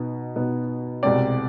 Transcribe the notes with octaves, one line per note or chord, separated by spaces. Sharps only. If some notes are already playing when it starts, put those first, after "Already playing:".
Already playing: B2 B3 D#4
B2 B3 D#4
C2 B2 G#3 C4 D5